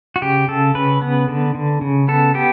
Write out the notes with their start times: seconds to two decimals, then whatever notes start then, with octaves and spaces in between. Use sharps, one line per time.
0.16 F#4
0.22 C#3 G4
0.48 C#3 A4
0.75 C#3 B4
1.02 B3
1.28 D3
1.55 D3
1.81 C#3
2.08 B3 A4
2.34 B3 G4